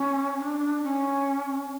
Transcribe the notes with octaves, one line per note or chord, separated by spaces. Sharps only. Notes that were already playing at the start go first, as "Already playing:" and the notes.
Already playing: C#4
D4
C#4